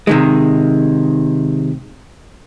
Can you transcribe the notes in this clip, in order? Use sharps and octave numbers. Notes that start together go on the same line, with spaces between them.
C3 D#3 G#3